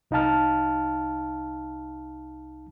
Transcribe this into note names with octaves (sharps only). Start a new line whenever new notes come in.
C2 D#4 F5 A5 F6